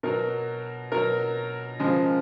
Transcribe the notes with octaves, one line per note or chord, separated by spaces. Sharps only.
B2 F#3 A#4
B2 F#3 A#4
C#3 F3 G#3